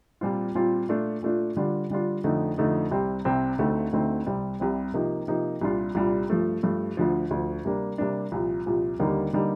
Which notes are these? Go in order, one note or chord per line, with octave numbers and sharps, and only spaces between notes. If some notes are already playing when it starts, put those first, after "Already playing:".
A#2 G3 C4 F4
A#2 G3 C4 F4
A#2 A3 D4 F4
A#2 A3 D4 F4
D3 G3 D4 F4
D3 G3 D4 F4
F2 D3 A3 D#4
F2 D3 A3 D#4
C2 C3 G3 C4
C2 C3 G3 C4
D2 D3 A3 C4 D#4
D2 D3 A3 C4 D#4
C2 C3 G3 C4
C2 C3 G3 C4
C3 F3 A#3 D#4
C3 F3 A#3 D#4
C2 A#2 G3 D4 F4
C2 A#2 G3 D4 F4
G2 F3 A3
G2 F3 A3
D2 D3 F3
D2 D3 F3
C3 G3 A#3 D4
C3 G3 A#3 D4
C2 A#2 F3
C2 A#2 F3
D#2 D3 G3 A#3 D#4
D3 G3 A#3 D#4